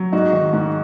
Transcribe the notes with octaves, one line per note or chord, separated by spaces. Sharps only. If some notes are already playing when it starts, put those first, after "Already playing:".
Already playing: F#3
G#2 D#4 F#4
D#3
G#2